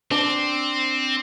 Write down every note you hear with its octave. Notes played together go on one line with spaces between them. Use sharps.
C4 D4